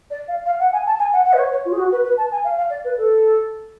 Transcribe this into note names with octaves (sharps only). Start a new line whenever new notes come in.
D5
F5
F5
F#5
G#5
A5
G#5
F#5
F#5
B4
C#5
C#5
F4
G#4
F#4
B4
B4
A5
G#5
F5
F5
D5
B4
A4